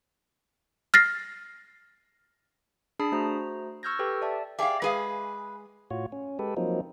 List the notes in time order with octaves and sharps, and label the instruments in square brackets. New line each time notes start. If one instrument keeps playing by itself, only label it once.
[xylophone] F6 A6 A#6 C7
[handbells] D4 G#4 A5 B5 D#6 C7
A3 F#4 C5 A#5
C#6 E6 F6 G6 G#6 A#6
G4 A4 B4 G5
D5 E5 A5
[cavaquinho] G4 G#4 D5 [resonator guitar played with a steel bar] E5 F5
[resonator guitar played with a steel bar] G#3 G#4 F5 [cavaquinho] B4
[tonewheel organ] A2 F4 F#4 C#5
C#4
G#3 G4 A4 B4
F3 F#3 A#3 C4 D#4